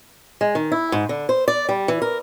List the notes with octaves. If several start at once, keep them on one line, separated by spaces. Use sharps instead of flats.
G#3
D#3
E4
G#2
D3
C5
D5
G3
E3
A#4